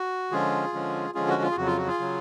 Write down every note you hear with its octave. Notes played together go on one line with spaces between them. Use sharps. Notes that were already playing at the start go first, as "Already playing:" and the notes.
Already playing: F#4
D3 F3 G#3 C#4 F4 G#4
D3 F3 G#3 C#4
D3 F3 G#3 C#4 F4 G#4
F#4
F4
G#4
F2 C#3 F#3 F#4
F4
F#4
F4 G#4
C#3 F#3